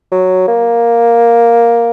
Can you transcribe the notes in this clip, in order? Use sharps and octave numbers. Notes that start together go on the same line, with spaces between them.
F#3
A#3